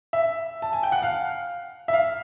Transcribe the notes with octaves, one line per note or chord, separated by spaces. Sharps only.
E5
A5
G#5
G5
F#5
F5
E5
F5